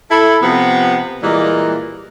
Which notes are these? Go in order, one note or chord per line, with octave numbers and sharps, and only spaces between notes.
E4 A4
C3 F3 B3
A#2 E3 G3 G#3 A#3